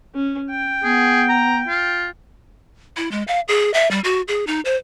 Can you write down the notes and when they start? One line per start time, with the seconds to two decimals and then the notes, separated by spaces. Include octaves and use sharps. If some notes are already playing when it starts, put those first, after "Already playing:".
0.14 C#4
0.50 G5
0.84 B3 G#4
1.29 A#5
1.68 F4
2.97 E4
3.11 G#3
3.27 F5
3.48 G#4
3.74 E5
3.91 G3
4.04 F#4
4.28 G#4
4.47 D#4
4.65 C5